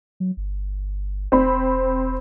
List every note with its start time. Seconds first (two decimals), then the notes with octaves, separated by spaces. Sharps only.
0.20 F#3
0.37 G1
1.32 E1 C4 B5